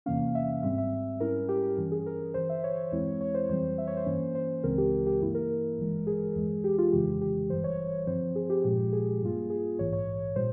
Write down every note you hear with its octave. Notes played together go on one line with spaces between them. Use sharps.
E2 C3 E3 A#3 C#4 F5
E5
G#1 G#2 G3 C4 E5
E5
G#2 G3 C#4 E4 A#4
G4
G4
G2 E3 G3 C#4
G#4
A#4
G1 G2 E3 C5
E5
C#5
E2 E3 G#3 C4 E4
C#5
C5
F2 E3 G3 C4 C5
E5
C#5
C5
G2 E3 A#3 C#4
C5
C#2 C#3 E3 G#3 C4 A#4
G4
G4
G2 E3 A#3 E4
A#4
G#1 G2 E3 G#3
G#4
E2 E3 G#3
G4
F4
G1 F2 C#3 E3 G#3 G4
G4
G#1 G2 E3 G3 C5
C#5
G1 G2 F3 C4 C5
G#4
G4
A#2 F3 G#3 G4
G#4
G2 G3 A#3 F4
G#4
A#1 G#2 E3 C#5
C#5
A#2 G3 C5